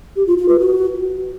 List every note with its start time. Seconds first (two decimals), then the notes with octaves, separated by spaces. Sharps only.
0.16 G4
0.27 F4
0.38 F4
0.49 B4
0.59 F#4